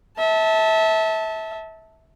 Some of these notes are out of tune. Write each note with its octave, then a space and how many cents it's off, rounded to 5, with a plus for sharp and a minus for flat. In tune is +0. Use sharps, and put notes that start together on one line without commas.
E5 -30 A5 +0